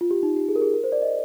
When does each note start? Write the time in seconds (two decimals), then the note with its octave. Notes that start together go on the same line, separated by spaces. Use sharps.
0.01 F4
0.11 G4
0.23 D#4
0.36 G4
0.49 G#4
0.56 A#4
0.62 G#4
0.74 A#4
0.84 C5
0.92 D5
1.02 D#5